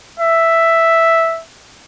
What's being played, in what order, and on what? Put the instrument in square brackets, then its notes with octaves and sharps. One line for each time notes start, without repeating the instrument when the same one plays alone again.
[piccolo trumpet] E5